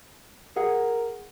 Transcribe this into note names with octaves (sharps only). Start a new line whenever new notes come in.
G#4 A#4 F#5